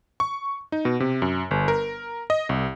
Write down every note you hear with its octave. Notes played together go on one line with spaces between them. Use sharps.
C#6
D#4
B2
C3
F#2
G1
A#4
D#5
C2